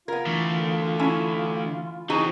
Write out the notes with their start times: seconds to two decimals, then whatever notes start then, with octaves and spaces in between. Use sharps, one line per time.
0.08 B3 F4 A#4 G#6
0.26 D3 E3 A3 C#6
0.99 C#4 E4
2.10 E3 C4 D#4 F#4 G#4 D#5